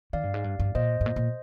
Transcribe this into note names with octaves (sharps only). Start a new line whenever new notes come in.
D#3 D5 F5
G2
G#2
G2
G2
A#2 C5 D#5
G#2
A#2
A#2